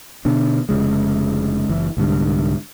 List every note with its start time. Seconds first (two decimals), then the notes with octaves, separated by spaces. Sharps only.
0.25 B2 D3 B3 D4
0.69 F1 C#2 C#3 G#3
1.69 F#1 E3
1.97 C2 G#2 D3 G3